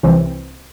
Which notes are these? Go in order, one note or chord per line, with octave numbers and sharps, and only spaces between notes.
C2 C3 E3 C4